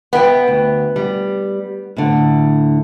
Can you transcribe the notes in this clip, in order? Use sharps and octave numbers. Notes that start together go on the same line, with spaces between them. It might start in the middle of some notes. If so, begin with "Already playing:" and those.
B3 E5 G5
D2
G3
A2 D3